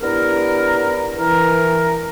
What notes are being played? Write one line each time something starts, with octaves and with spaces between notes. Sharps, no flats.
B3 D4 E4 G4 A#4
E3 A#4